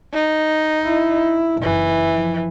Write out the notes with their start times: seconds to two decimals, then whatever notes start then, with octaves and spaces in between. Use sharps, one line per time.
0.13 D#4
0.85 E4
1.62 F#1 E3
2.12 F3